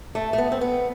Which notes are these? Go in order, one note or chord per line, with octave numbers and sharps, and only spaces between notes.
A3
A3
B3
C4
B3